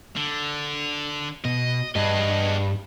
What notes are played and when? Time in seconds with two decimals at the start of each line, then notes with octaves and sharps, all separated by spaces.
0.16 D3
1.45 B2 D#5
1.96 G2 B3 G#4 D#5